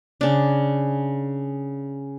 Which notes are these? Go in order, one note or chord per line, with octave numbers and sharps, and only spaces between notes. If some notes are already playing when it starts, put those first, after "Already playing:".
C#3 D4